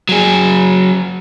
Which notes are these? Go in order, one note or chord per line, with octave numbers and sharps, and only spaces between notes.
F#3 G#4